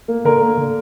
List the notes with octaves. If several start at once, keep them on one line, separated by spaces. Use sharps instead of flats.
A#3
D3 A#4
A#3
D3